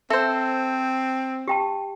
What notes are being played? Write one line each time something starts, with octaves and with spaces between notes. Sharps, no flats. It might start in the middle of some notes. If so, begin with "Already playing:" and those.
C4 A4 C5 E5
G4 G5 A5